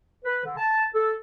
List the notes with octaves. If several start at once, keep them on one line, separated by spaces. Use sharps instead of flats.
B4
D3
A5
A4